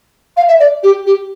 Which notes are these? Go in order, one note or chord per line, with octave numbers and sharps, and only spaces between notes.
F5
E5
D5
G4
G4